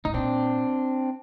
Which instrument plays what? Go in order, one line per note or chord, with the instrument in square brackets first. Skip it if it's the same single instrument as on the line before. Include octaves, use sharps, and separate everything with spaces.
[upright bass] A2 [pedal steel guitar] D#4
[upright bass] A#2 [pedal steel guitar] C4 D4